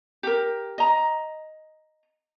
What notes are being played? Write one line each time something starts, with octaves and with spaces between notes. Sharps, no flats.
G4 A#4
D#5 A#5